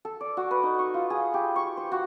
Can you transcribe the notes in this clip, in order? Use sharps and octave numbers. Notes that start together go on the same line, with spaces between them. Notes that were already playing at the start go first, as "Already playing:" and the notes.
A4
D5
F#4
B4
D#4
C#6
F4
G#4
G4
C#6
C5
F#4